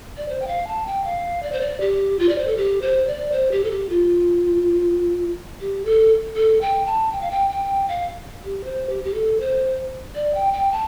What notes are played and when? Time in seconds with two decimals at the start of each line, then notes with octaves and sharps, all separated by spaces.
0.17 D5
0.29 C5
0.42 G5
0.48 F5
0.67 A5
0.86 G5
1.05 F5
1.43 D5
1.52 C5
1.61 D5
1.81 G4
2.19 F4
2.29 D5
2.38 C5
2.47 A4
2.57 G4
2.82 C5
3.07 D5
3.32 C5
3.52 G4
3.64 A4
3.71 G4
3.89 F4
5.61 G4
5.85 A4
6.36 A4
6.61 G5
6.86 A5
7.12 G5
7.21 F5
7.31 G5
7.50 G5
7.88 F5
8.45 G4
8.64 C5
8.90 G4
9.04 G4
9.14 A4
9.40 C5
10.15 D5
10.35 G5
10.53 G5
10.72 A5